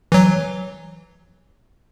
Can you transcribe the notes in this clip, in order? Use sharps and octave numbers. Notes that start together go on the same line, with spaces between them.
E3 F#3